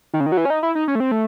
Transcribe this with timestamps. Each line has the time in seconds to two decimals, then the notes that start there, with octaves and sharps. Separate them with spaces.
0.14 D#3
0.20 C#3
0.26 D#3
0.32 F#3
0.37 E3
0.45 C#4
0.50 D#4
0.63 E4
0.75 D#4
0.88 C#4
0.95 A3
1.00 C4
1.11 A3